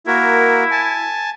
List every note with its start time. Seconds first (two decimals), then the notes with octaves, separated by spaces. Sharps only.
0.07 A#3 E4 F#4 A#4
0.71 G#5 A5